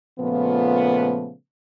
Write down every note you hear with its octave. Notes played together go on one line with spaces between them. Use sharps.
A#2 C#3 F3 A3 B3